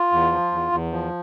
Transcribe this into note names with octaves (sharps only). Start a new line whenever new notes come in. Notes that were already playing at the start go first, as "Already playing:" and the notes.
Already playing: F4
E2
F3
E2
E2
F3